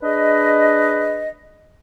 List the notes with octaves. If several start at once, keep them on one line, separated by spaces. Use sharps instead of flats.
D4 G#4 B4 D#5